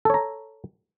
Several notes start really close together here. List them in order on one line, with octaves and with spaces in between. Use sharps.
A4 C#5 A#5